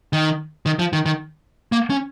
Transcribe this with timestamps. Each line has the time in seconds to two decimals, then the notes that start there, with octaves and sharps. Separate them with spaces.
0.13 D#3
0.66 D#3
0.79 F3
0.93 D#3
1.06 D#3
1.72 A#3
1.90 C#4